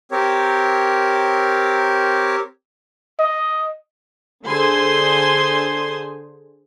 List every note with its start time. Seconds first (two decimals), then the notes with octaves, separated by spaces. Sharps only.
0.11 C4 G4 A#4 C#5
3.20 D#5
4.46 D3 G#4 C5 G#5 C6